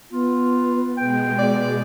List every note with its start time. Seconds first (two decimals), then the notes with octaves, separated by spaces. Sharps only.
0.12 B3 F4
0.98 B2 G#3 G5
1.38 D5